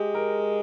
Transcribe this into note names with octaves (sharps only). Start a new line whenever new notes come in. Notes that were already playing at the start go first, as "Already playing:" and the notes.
Already playing: G#3 G4
A#4